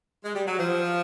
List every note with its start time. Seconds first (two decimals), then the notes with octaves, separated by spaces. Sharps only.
0.24 G#3
0.35 G3
0.47 F#3
0.59 F3